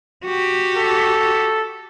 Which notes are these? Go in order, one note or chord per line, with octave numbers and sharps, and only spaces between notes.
F#4 G4
A4